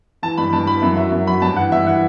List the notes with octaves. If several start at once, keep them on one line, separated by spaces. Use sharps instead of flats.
E3 A5
G2 B5
G2 A5
E3 B5
F#2 E5
F#3 E5
F#2
F#3 B5
G2 A5
E3 F#5
G2 E5
E3 F#5